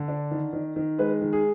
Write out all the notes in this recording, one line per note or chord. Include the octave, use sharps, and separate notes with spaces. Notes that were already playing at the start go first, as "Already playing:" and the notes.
Already playing: D3
D4
D#3
D#3
D#3
G#3 B4
D#3
G#4